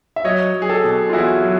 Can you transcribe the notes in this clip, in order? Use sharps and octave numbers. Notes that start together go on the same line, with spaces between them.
E5
F#3 C#5 D#5
F#3
G#4
G4 A4
B2
F4
E2 E4 F#4
F#3